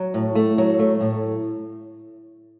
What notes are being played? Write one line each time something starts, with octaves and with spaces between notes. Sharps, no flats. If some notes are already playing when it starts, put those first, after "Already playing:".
Already playing: F#3
A2
A3
F#3
A3
A2